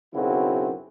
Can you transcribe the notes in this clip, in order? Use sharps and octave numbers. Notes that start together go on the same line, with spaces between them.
B1 F#2 C#3 C4 E4 F#4